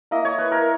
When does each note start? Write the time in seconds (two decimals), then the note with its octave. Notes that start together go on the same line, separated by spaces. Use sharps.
0.11 A#3 E4 D#5
0.25 C#5
0.38 B4
0.52 A#4